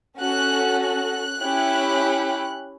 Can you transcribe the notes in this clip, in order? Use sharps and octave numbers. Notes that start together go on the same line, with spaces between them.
C#4 F#4 A4 F#6
F#6
C#4 E4 G4